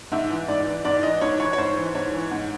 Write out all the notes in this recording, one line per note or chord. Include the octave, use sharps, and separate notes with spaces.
G#2 E5
E3
G#2 D5
E3
G#2 D5
E3 D#5
G#2 C#5
E3 C#5
C#5
G#2 C5
E3
G#2 C#5
E3
G#2